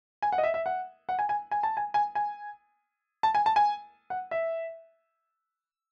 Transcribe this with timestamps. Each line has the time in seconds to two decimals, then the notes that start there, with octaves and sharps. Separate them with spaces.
0.22 G#5
0.32 F#5
0.38 D#5
0.44 E5
0.54 E5
0.66 F#5
1.09 F#5
1.19 G#5
1.29 G#5
1.51 G#5
1.63 A5
1.77 G#5
1.94 G#5
2.15 G#5
3.23 A5
3.35 G#5
3.46 A5
3.56 G#5
4.10 F#5
4.31 E5